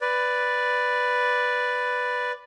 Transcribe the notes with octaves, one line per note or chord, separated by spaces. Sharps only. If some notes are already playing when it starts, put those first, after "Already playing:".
B4 D5